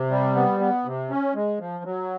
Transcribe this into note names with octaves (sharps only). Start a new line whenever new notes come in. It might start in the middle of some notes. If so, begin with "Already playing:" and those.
Already playing: C3
G3
B3
B3
C3
C#4
G#3
F3
F#3